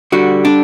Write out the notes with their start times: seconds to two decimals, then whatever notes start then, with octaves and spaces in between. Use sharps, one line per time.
0.12 D3 G3 F#4
0.45 D4